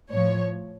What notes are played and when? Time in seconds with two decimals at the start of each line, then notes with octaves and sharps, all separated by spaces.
0.11 A2 F3 C#5